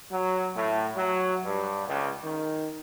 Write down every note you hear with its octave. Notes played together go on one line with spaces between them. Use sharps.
F#3
A2
F#3
G2
C#2
D#3